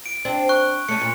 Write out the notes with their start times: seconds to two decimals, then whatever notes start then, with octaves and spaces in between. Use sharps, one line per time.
0.06 D7
0.25 C4 D4
0.49 C#6 F#6
0.89 A3 C#4 C#7
1.01 A#2